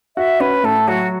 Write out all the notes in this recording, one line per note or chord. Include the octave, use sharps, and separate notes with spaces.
F#4 E5
C#4 B4
A2 A4
F#3 F#4